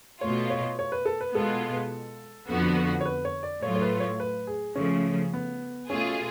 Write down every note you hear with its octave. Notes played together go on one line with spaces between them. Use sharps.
B2 A3 F4 C#5
C#5
C#5
B4
A4
B4
B2 G#3 B3 F4 A4
F2 D3 F3 B3 F#4
C#5
B4
C#5
D5
A2 F#3 A3 F4 C#5
C#5
B4
C#5
B4
G#4
C#3 F3 A3 C#4
B3
B2 A3 C#4 F4 G#4